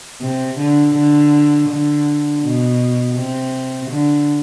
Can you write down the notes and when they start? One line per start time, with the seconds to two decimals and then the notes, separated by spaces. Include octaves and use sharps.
0.21 C3
0.58 D3
0.94 D3
1.69 D3
2.43 B2
3.15 C3
3.90 D3